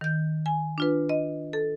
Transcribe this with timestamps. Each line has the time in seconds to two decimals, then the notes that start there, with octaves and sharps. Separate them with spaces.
0.01 D#3 G6
0.46 G#5
0.78 D4 F4 B4
1.09 D#5
1.53 A4